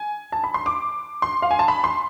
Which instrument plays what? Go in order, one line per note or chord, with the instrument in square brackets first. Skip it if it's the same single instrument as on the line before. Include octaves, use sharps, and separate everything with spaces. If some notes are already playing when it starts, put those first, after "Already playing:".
Already playing: [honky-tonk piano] G#5
A5
B5
C6
D6
C6
F5
G#5
A5
B5
C6